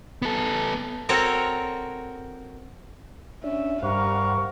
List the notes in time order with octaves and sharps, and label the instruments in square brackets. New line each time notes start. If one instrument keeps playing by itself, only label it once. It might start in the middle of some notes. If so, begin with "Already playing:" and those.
[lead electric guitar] B3 A4
[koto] C4 F#4 A4 A#4 C#5
[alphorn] C#4 [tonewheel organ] D4 [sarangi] E5
[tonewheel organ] G2 C5 F#5 [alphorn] G3 [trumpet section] A#4 C#6 [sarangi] F5